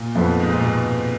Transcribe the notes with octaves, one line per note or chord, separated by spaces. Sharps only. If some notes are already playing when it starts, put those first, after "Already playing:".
Already playing: A#2
F2 F3 B3
G#2
A#2
G#2 B2